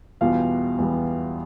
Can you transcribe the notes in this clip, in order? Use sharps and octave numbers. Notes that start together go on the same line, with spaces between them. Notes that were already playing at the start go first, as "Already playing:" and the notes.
E2 B2 G3 B3 F4 F5
E2 B2 G3 B3